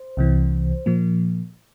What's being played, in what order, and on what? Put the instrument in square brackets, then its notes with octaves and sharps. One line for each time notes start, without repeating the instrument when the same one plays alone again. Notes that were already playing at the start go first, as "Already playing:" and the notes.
Already playing: [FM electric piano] C5
C2 C3 E3
A#2 F3 A#3